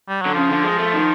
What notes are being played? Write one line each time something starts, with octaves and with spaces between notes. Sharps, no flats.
G3
D3 F#3
C#3 F3
D3
G#3
A3
D#3